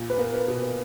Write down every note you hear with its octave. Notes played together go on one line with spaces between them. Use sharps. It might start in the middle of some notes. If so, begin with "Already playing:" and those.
Already playing: A#2
B4
B3 A#4
B4
B2 A#4
B4